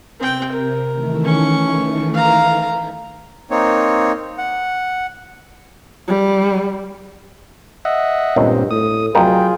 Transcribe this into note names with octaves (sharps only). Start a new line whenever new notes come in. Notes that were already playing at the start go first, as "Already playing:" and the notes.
C3 C4 G5
A#4
D#3 E3 A3
C#4 C#6
F5 A#5
A#3 C4 D#4 C#5
F#5
G3
D#5 E5 F#5
C#2 G2 A#2 D#3 C4
A2 D#6
C2 F2 F#3 F4 G#4 A#4 G5